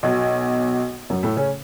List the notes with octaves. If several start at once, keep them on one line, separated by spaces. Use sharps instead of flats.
B1 B2
F#2 F#3
A2 A3
C#3 C#4